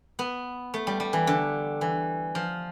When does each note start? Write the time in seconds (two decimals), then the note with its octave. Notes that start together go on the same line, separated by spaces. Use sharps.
0.19 B3
0.74 A3
0.87 G3
1.00 G3
1.13 E3
1.27 D3
1.81 E3
2.35 F3